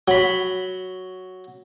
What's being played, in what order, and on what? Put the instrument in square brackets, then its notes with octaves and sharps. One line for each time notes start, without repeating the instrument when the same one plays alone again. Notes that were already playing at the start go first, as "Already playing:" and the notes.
[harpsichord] F#3 B5